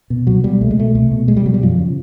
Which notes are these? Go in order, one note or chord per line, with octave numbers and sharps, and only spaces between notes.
B2
C2 F#3
B2 G3
C2 A3
G#3
B2 A3
C2 A3
B2
C2 G#3
G3
B2 F#3
G3
F#2 F3
C#3